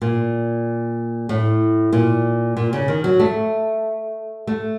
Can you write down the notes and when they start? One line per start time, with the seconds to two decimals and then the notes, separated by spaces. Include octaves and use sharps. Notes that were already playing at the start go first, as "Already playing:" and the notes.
0.02 A#2
1.29 A2
1.92 A#2
2.57 A#2
2.73 C#3
2.88 D#3
3.04 F#3
3.20 A3
4.47 A3